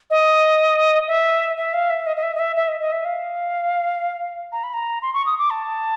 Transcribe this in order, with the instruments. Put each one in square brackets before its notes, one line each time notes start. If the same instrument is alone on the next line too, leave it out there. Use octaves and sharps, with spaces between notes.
[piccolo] D#5
E5
E5
F5
E5
D#5
D#5
E5
D#5
E5
E5
D#5
D#5
E5
F5
A#5
B5
A#5
C6
C#6
D#6
D6
A5